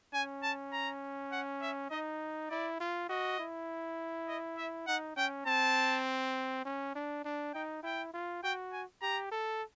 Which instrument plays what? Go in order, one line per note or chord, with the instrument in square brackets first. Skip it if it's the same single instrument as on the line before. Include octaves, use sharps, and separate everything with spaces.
[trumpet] C#4 [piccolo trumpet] G#5
[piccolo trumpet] A5
A#5
F#5
E5
[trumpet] D#4 [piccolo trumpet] D#5
[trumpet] E4 [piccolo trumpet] D5
[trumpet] F4
[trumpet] F#4 [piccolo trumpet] D#5
[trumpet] E4
[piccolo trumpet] D#5
E5
[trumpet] D#4 [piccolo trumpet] F#5
[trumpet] C#4 [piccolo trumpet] G5
[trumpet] C4 [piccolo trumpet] A5
[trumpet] C#4
D4
D4
[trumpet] D#4 [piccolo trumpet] G5
[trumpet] E4 [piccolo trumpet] G5
[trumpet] F4
[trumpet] F#4 [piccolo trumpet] G5
[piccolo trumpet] G#5
[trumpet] G4 [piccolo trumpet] A#5
[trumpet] A4